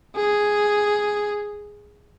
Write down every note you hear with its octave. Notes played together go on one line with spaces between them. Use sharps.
G#4